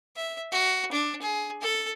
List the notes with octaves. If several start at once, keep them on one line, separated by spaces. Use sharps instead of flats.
E5
F#4
D4
G#4
A4